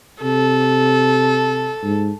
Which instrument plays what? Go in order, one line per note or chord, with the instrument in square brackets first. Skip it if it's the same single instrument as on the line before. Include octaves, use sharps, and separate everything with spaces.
[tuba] C3 [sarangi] A4
[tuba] G#2